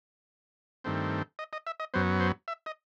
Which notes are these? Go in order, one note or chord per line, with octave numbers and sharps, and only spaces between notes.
G2 D#3 A3 C4
D#5
D#5
E5
D#5
F#2 F#3 B3 C5
C5
E5
D#5